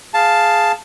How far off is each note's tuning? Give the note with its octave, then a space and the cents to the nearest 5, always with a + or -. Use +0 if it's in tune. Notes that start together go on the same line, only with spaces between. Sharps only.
G#4 +0 F5 +0 A5 +0